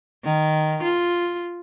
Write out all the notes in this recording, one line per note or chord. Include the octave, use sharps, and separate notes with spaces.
D#3
F4